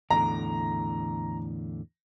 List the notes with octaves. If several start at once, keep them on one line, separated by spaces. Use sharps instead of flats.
E2 A2 D3 A#5